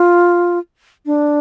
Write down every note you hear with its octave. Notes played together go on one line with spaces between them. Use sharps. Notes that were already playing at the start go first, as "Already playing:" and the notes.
Already playing: F4
D4